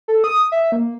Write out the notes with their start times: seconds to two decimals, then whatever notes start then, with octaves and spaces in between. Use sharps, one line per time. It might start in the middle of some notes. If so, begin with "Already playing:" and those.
0.08 A4
0.24 D#6
0.52 E5
0.72 A#3